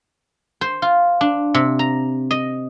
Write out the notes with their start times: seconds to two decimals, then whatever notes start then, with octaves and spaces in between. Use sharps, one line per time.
0.61 C5
0.82 F4
1.21 D4
1.54 C3
1.79 A#5
2.31 D#5